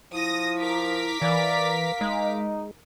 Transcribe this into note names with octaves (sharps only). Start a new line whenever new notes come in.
F3 E4 D#6 A#6
A#4 D6 B6
E3 D5 F5
G#3 D#4